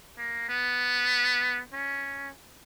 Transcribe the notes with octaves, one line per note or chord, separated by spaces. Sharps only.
A#3
B3
C#4